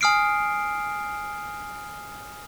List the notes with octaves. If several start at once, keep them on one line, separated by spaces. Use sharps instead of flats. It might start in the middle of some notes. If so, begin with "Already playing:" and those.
G#5 D#6 F6 C7 D7